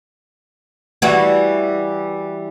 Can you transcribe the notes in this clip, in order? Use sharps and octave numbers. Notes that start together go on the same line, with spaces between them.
E3 G3 F#4